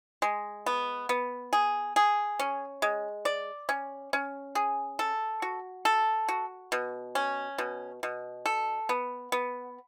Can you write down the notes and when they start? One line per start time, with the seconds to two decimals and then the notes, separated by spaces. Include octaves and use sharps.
0.22 G#3
0.66 B3
1.09 B3
1.53 G#4
1.96 G#4
2.39 C#4
2.82 G#3
3.25 D5
3.69 C#4
4.13 C#4
4.55 G#4
4.99 A4
5.42 F#4
5.85 A4
6.28 F#4
6.72 B2
7.15 C#4
7.58 B2
8.03 B2
8.46 A4
8.89 B3
9.32 B3